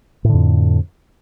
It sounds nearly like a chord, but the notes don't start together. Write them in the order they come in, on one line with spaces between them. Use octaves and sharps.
A2 D3 F2